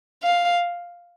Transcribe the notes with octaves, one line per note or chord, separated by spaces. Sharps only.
F5